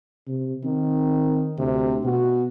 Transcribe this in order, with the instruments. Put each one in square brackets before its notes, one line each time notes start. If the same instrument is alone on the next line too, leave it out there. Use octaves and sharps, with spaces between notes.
[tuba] C3
[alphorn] D#3 [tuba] C4
[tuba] D2 [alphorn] C3
[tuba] B2 [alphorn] F#4